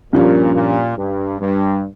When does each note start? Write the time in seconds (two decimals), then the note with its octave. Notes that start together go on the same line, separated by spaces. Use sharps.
0.13 G2 A#2 F3 C#4
0.55 A#2
0.97 G2
1.40 G2